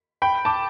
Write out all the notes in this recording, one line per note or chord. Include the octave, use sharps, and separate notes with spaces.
G5 B5
A5 D6